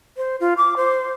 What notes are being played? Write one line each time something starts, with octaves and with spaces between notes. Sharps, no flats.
C5
F4
D6
C5